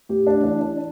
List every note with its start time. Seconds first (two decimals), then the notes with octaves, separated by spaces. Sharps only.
0.09 A2 G4
0.27 D4
0.44 E3 D4
0.61 D4